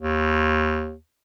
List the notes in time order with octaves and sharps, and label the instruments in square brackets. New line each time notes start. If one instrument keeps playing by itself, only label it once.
[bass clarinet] D#2